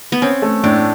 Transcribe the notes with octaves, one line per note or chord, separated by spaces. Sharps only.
B3
C4 C#4
A3
A2 D4